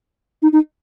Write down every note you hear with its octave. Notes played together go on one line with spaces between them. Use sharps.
D#4
D#4